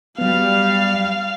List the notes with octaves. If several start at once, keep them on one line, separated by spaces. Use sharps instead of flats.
F#3 G3 B3 F5